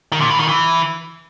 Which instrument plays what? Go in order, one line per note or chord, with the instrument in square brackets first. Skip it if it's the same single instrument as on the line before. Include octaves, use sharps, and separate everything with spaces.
[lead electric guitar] D#3
A#2
E3
D#3
E3